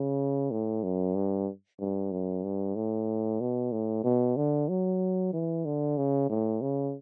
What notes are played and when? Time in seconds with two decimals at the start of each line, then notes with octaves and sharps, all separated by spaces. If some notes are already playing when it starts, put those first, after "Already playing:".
Already playing: C#3
0.51 A2
0.83 F#2
1.15 G2
1.80 G2
2.11 F#2
2.44 G2
2.76 A2
3.40 B2
3.72 A2
4.04 B2
4.36 D3
4.69 F#3
5.33 E3
5.65 D3
5.97 C#3
6.29 A2
6.61 C#3